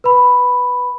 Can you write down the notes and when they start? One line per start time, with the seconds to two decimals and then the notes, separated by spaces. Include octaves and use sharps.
0.04 B4 B5